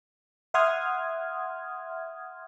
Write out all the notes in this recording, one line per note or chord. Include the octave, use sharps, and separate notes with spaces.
E5 F#5 C6 D#6 F6 G#6